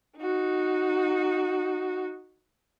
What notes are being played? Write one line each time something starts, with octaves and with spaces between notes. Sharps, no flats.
D#4 F#4